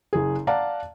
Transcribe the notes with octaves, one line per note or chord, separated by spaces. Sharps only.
F#1 G#4
D5 F5 F#5 A5 A#5